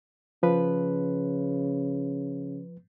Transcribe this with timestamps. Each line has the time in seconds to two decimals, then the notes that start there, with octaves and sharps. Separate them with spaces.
0.43 C#3 F3 B4